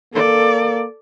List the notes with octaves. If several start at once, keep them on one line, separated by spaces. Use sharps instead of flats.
A#3 A4 D5